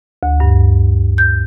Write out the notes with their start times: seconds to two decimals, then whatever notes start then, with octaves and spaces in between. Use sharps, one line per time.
0.23 D2
0.40 G2
1.18 G6